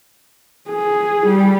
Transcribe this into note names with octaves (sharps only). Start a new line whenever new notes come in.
G#4
G3